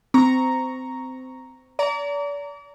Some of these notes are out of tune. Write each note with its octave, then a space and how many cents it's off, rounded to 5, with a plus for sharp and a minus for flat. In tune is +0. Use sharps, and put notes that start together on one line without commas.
C4 -20 A#5 +0 C#6 +0
D5 -40 A#5 -15